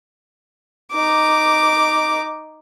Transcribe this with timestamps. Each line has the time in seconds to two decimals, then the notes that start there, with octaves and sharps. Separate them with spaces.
0.92 D#4 D6